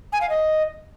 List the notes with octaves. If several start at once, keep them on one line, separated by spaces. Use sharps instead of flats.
G#5
F5
D#5